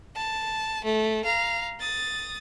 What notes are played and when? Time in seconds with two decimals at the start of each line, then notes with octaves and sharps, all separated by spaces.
0.15 A5
0.84 A3
1.25 F5 A#5
1.80 D#6 A6